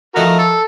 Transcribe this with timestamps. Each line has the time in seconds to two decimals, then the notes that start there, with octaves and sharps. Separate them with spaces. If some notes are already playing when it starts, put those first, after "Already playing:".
0.15 F3 A3 D#4 F#4 A#4
0.39 A4